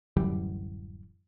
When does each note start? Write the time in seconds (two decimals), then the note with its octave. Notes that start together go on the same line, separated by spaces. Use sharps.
0.17 D1 F#2 E3 G3